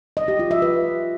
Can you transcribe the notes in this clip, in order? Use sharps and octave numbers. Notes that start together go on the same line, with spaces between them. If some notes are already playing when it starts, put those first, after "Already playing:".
D#5
G4
F4
E5
B4